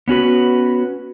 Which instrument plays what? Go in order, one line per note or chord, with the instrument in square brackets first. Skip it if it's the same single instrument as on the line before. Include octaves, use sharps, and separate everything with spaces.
[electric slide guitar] B3 C#4 F#4 B4